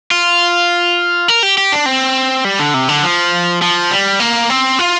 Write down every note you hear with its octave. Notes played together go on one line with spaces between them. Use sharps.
F4
A#4
G4
G4
D4
C4
G3
D3
C3
D3
F3
F3
G3
A#3
C4
F4